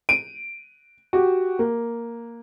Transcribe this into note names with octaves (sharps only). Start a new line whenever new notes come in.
D7 D#7
F#4 G4
A#3